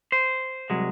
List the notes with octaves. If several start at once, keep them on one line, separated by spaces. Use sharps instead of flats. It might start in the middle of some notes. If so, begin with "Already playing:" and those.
C5
C2 F#3 G#3